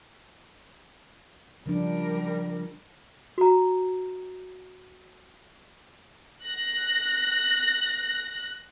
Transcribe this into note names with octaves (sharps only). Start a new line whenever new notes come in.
C#3 F3 G3 D4 A#4
F#4 A#5
F#6 A#6